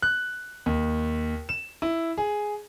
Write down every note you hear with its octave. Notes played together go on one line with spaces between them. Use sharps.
F#6
D#2
E7
E4
G#4